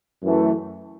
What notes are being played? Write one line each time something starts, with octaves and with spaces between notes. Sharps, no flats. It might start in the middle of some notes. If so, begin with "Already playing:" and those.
F#2 E3 A3